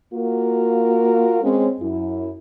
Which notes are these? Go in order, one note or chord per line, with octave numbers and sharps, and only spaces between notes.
A#3 F4 F#4 A#4
G#3 C4 C#4
F#2 E4